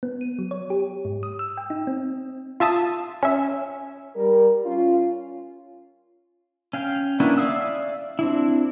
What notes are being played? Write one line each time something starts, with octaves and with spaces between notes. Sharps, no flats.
B3
D#7
F#3
C#5
G4
G#2
D#6
E6
G5
D#4
C4
F4 E5 A5 D#6
C#4 E5
G3 A#4
C#4 F4
C#4 F5 G5
A#3 B3 C#4 D4 E4
D5 E5 F5 D#6 E6
C4 D4 E4